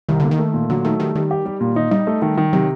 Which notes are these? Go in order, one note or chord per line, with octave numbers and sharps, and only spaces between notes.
C2 D#3
D3 A#3
D#3
A3
A#2
D3 F#3
D#3 A3
D#3 G3
D#3 G3
G4
G3
A#2
D#4
G3 D#4
A3
D#3
D#3
C3 F#3